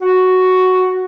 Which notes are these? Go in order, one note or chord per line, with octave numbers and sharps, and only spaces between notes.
F#4